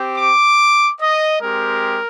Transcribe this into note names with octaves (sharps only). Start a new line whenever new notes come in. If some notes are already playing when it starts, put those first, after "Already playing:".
Already playing: C4 G4
D6
D#5
G#3 C4 G4 A#4